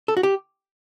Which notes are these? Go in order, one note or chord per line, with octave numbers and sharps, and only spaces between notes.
A4
F#4
G4